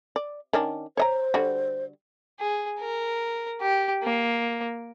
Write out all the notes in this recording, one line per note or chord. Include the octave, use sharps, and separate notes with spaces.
D5
D#3 C#4 D4
C5 C#5 D#5 A#5
D3 G3 F#4
G#4
A#4
G4
A#3